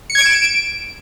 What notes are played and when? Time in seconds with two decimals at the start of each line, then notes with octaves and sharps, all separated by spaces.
0.10 C#7
0.15 G#6
0.20 D7
0.26 E7
0.31 D7